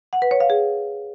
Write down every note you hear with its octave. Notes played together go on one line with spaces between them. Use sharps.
F#5
B4
C#5
F5
G#4